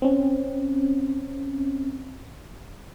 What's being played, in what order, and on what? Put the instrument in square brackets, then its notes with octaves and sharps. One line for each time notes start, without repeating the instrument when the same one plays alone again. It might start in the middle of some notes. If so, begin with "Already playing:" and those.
[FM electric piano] C4 C#4